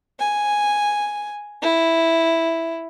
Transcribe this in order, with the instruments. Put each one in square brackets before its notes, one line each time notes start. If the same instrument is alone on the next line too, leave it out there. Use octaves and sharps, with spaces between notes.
[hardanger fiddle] G#5
E4